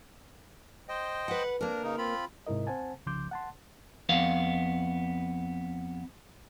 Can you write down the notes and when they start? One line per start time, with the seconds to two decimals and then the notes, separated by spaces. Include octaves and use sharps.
0.89 C5 D#5 G5
1.28 B4 F#5
1.61 A#3 D4 A#4
1.83 C#3 D#4
1.98 C4 F4 B5
2.47 G#2 C3 E4 A#4 D#5
2.67 C4 C5 F#5 G#5 A5
3.06 C2 C#3 F3 C6 D6 G6
3.31 F#5 A5 C6
4.09 F2 B3 F5